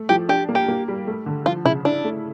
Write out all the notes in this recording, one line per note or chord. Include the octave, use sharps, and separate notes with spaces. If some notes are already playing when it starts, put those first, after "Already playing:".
Already playing: A3
F3 G4
D4 G4
A#3
G4
A#3
G3
A3
D3
F3 F4
C#3 E4
D4 E4
A3